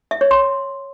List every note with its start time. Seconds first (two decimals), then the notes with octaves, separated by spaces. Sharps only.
0.11 E5
0.21 C#5
0.31 C6